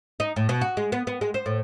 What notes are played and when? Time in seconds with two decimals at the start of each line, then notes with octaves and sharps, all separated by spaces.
0.20 D#4
0.36 A2
0.49 B2
0.61 F#4
0.77 G#3
0.92 B3
1.07 B3
1.21 G#3
1.34 C5
1.46 A2